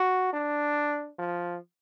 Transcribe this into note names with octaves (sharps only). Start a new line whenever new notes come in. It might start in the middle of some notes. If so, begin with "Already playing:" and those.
Already playing: F#4
D4
F3